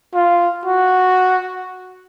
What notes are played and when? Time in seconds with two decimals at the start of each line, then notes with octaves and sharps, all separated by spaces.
0.14 F4
0.65 F#4